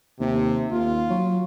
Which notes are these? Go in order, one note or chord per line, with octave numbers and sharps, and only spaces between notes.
D#2 C3
D#2 F4
F#3